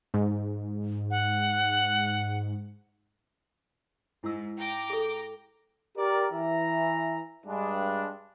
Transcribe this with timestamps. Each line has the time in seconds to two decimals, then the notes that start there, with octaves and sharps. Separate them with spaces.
0.14 G#2
1.10 F#5
4.24 G#2 E4 E6
4.57 G5 A#5 D6
4.90 G#4 A4
5.97 G4 A#4 D5
6.31 E3 E5 A#5
7.46 G2 G#3 D4